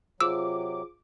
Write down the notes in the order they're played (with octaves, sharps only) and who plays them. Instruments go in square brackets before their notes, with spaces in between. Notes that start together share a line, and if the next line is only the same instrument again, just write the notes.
[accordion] C3 F#3 [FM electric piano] F4 G#4 C5 [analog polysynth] D6 [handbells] E6